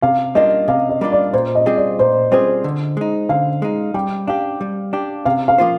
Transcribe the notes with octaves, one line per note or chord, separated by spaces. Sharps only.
C3 F5
G3 A#3 D4 F4 D#5
C3 F5
D#5
G3 A#3 D4 F4
D5
A#2 C5
D#5
G3 C4 F4 G#4
D5
A#2 C5
G3 C4 F4 G#4 C5
D3
G#3 D#4
D3 F5
G#3 D#4
G3 G5
D4 G4 F5
G3
D4 G4
C3 F5
F5
F3 A#3 F4 C5